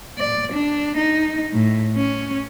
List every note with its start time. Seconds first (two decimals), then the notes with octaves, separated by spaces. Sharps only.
0.18 D5
0.52 D4
0.97 D#4
1.53 A2
1.96 C#4